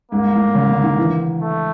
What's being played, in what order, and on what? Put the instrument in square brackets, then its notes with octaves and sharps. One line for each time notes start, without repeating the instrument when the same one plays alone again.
[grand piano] G#2 [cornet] A#3
[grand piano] A2
C#3
D3
D#3
E3
[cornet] A3